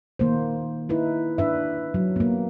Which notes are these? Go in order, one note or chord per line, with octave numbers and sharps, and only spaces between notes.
D#3 A#3 C5
D#4 E4 B4
D4 B4 E5
F#3
A#3 B3